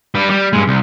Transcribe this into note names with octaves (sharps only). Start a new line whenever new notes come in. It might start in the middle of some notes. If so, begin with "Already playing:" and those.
G3 B4
G3
G2 G#3
C2